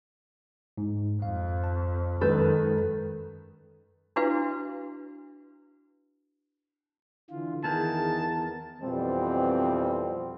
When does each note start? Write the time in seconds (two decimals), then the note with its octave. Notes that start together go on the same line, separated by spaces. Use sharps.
0.77 G#2
1.22 F2 F5
1.64 A5
2.21 F#2 D#3 G#3 A4 B4 G6
4.16 D4 E4 F#4 B4 F5
7.30 D3 E3 F4
7.64 E2 D#3 G#4 A#4 A5
8.82 F2 B2 E3 G3 C4